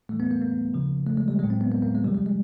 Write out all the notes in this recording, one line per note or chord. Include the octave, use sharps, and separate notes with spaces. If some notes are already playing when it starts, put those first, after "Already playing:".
A2 E3 G3 A3
B3
A#3
A#3
C#3 F3
A3
G#3
G3
A2 F#3 G#3
C4
B3
A#3
A#3
G#3
C3 F3 G3
G#3
G#3